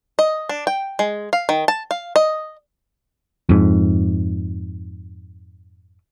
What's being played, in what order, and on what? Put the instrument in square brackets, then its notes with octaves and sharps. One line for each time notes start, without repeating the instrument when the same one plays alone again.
[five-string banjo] D#5
D4
G5
G#3
F5
D#3
A5
F5
D#5
[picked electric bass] F2 G#2